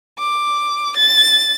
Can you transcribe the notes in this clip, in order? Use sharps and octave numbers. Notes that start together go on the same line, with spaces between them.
D6
A6